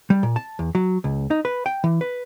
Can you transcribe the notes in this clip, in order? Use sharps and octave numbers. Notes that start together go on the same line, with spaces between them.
G3
A#2
A5
E2
F#3
C#2
D#4
B4
G5
E3
B4